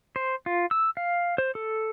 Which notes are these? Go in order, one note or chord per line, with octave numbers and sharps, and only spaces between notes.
C5
F4
E6
F5
C5
A4